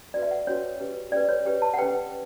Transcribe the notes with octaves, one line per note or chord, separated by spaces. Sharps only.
C#4 F#4 B4 D5
E5
F#5
C#4 F#4 B4 C#5
C#4 G4 B4
C#4 G4 B4 D5
C#5
C#4 G4 B4
A5
F#5
C#4 G4 B4 G5